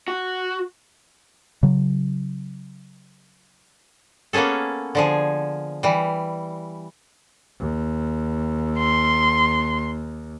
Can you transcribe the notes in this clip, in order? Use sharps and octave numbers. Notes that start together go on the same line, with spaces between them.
F#4
C#3 F#3
A#3 B3 C#4 G#4 A4
D3 F3 G#4
E3 G3
D#2
C6